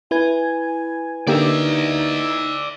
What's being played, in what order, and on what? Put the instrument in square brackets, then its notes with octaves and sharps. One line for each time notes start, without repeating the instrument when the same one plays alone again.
[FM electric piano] E4 B4 G#6 [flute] G#5
[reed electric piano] D3 A#3 G4 [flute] D#4 [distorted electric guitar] D5 E5